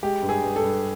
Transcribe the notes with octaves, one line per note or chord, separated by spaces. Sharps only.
G#3 G4
G2
G#4
G2
A4
G2